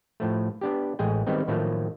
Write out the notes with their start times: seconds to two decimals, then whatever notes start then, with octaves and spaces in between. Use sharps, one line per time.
0.20 A2 F3 A3
0.61 B3 D4 G4
0.99 A1 G#3 G#4 G5
1.26 D#3 G3 G#3 B3 C4 D#4
1.48 A2 D#3 F3 F#3 A3 A#3